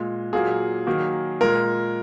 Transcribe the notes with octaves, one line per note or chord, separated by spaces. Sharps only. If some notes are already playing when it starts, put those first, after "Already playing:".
Already playing: A#2 G#3
A#2 F#3 A#3 G#4
D#3 F#3 A#3
A#2 G#3 A#4